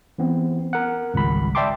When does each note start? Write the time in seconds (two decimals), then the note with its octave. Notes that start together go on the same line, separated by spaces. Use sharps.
0.18 E3 B3 C4
0.73 A#4 F#5
1.14 G#1 C#2 G3 B5
1.55 D5 E5 G5 A5 C6 D6